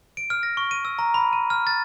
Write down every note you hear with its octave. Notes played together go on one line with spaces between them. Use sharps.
D7
F6
A#6
C#6
D#7
E6
A#5
B5
D#7
F6
A6